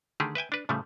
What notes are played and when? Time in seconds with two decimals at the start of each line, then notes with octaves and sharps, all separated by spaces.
0.20 D3 D#3 A3 G4 G#4
0.35 B4 E5 G5 G#5
0.52 D4 B4
0.69 A2 C#3 F3 G3 A3